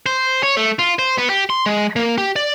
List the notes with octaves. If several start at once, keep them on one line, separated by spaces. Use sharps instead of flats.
C5
C#5
A3
F4
C5
B3
G4
C6
G#3
A#3
G4
D5